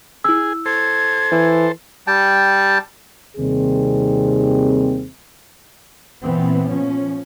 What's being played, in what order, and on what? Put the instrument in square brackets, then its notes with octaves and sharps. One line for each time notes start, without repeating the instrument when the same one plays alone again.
[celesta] E4 E6 [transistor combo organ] G#4
[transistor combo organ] A4 C5 [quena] G#6
[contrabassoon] E3
[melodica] G3 G5 A5
[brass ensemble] D#2 C3 D#3 G3 C4 G#4
[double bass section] A#2 E3 B3 C4
F3 C#4